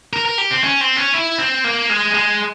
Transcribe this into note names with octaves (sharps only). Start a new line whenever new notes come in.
A#4
A#4
G4
C4
C#4
C4
C#4
E4
C4
A#3
G#3
G#3